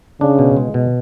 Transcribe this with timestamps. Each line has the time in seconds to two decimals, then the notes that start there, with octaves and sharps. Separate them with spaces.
0.21 C#3 D4
0.39 B2
0.57 G#3
0.74 B2